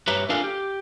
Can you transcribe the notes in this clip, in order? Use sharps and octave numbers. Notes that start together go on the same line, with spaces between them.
G2 G4 B4 C#5 E5 A#5
D4 F4 A4 A#4 F5 G#5
G4